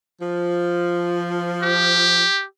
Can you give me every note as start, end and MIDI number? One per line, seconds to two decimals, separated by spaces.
0.21 2.23 53
1.62 2.44 67